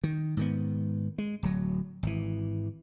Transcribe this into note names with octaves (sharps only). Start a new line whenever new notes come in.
D#3
G#2 D#3 B3
G#3
D1 F#3
G#1 E3